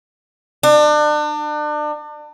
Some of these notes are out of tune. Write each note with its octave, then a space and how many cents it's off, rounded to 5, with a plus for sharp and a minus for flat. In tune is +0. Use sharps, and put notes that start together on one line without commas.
D4 +35